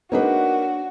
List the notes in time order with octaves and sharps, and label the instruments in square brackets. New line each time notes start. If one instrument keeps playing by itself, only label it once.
[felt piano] A#3 D#4 B4 [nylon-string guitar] D4 G#4 C#5 [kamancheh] F#4